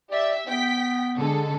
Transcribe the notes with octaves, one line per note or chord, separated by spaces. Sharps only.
G4 D5 E5
B3 G5 B6
D3 G#3 A4